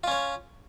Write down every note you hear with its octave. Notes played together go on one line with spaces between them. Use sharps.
C#4 F4 C#5